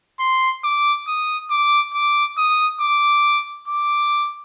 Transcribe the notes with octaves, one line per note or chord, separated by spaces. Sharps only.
C6
D6
D#6
D6
D6
D#6
D6
D6